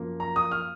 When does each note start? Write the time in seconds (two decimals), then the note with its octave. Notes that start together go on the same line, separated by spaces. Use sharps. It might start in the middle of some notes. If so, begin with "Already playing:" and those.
Already playing: F#2 F3 A#3
0.20 A#5
0.36 D#6
0.51 F6